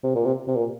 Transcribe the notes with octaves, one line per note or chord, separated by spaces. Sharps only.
C3
A#2
C3
C3
A#2